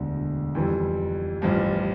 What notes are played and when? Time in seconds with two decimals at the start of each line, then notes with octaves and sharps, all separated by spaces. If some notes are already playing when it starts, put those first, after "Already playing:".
Already playing: E1 D2 D3
0.55 F2 E3 G3
1.42 A1 G2 F3